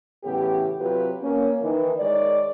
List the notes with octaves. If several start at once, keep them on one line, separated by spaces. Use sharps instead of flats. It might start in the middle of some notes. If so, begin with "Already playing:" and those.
A2 C#3 E3 B3 G4
C3 F#3 C4 F4 G4 B4
A#3 C#4
D#3 E3
D#3 G#3 C#5 D5